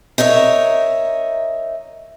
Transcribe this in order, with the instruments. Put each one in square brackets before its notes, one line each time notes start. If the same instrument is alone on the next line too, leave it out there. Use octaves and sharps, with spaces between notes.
[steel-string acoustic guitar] D#4 A#4 C#5 E5